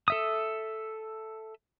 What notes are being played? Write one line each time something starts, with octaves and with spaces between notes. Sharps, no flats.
A4 E5 D#6